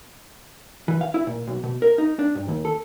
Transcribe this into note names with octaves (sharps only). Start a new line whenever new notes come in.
E3
F5
E4
A#2
B1
B2
A#4
D#4
D4
G2
D#2
A4